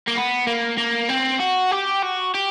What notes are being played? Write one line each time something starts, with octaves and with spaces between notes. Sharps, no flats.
A#3
B3
A#3
A#3
C4
F#4
G4
F#4
G4